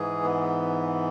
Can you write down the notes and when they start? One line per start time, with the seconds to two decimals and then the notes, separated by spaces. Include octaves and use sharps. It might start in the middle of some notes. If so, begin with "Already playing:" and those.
Already playing: G#2 E3 G#4
0.23 B3